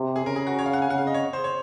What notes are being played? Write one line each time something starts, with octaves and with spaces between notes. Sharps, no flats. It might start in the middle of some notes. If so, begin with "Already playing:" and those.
Already playing: C3
G#4
C#3 A#4
G#4
F#4
C#5
F5
F#5
G#5
C#3 F#5
F5
D#5
C#5
C5
C#5